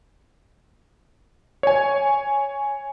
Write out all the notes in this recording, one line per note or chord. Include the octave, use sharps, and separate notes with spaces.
C#5 G#5